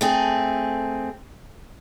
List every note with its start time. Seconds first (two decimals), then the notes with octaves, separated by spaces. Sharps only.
0.01 A3 C4 G#4